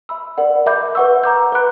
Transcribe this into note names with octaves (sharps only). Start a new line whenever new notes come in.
E5 B5 E6
A#4 D5 F#5
A#4 E5 B5 D6 G6
B4 F#5 C#6 E6
F#5 A#5 D6 G6
B4 F#5 B5 F#6